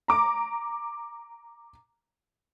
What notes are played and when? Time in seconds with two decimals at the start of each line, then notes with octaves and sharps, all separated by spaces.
0.08 A#5 D6